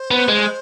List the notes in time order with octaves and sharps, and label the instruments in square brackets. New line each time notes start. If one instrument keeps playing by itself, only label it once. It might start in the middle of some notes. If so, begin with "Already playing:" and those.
Already playing: [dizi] C5
[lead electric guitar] B3
G#3